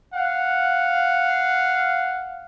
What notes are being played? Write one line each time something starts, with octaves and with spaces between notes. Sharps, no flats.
F5 F#5